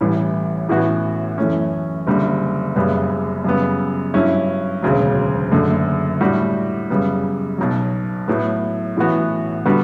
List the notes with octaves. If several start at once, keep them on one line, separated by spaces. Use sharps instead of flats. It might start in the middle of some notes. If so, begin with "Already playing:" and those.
A1 A2 E3 G3
A1 A2 E3 B3 F#4
F#2 E3 A3 C#4
F#1 F#2 D3 G3
F#1 F#2 C#3 G3 B3
F#2 C#3 G3 B3
G2 F#3 C#4 E4
E1 D2 C#3 F#3
F#1 F#2 D3 A3
A2 G3 D4 F#4
F#2 C#3 G3 B3
B1 B2 F#3
A2 F#3 B3
A1 A2 E3 B3 F#4
D3 G3 B3 F#4